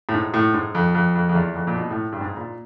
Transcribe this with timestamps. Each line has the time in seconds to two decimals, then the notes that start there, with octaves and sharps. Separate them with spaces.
0.09 A2
0.14 G#2
0.34 A2
0.54 G#2
0.75 F2
0.95 F2
1.15 F2
1.29 F2
1.35 E2
1.55 F2
1.67 A#2
1.76 B2
1.91 A2
2.12 G2
2.21 G#2
2.37 A#2